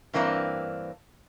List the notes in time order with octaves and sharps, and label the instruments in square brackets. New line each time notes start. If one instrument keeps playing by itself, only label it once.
[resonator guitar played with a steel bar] G2 E3 A#3 C4 D4